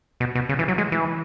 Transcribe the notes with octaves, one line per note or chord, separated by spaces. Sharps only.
B2
B2
C#3
E3
F#3
G#3
E3